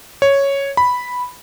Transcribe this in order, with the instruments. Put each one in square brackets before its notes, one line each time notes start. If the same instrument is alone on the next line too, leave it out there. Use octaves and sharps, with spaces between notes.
[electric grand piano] C#5
B5